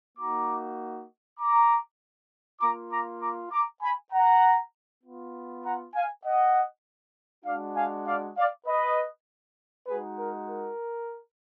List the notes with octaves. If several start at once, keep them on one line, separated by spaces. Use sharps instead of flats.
A#3 D#4 F#4 A#5 D6
A#5 D6
A#3 F4 A#5 D6
A#5 D6
A#5 D6
A#5 D6
G#5 B5
F#5 A#5
B3 F4
F#5 A#5
F5 G#5
D#5 F#5
G#3 D4 F#4 D5 F5
F5 G#5
D5 F5
D5 F5
B4 D#5
G#3 D#4 F#4 G#4 B4
A#4
A#4